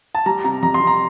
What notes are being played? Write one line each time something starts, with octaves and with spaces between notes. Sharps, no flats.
A5
G3 A#5
C3 A#5
F2 A#5
C6
C3
A#5